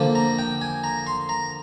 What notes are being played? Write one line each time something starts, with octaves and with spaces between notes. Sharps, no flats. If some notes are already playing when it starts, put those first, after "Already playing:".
Already playing: D3 F3 A#3
A#5
G5
G#5
A#5
C6
A#5